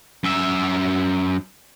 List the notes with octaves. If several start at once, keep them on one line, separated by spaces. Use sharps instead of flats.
F#2 E5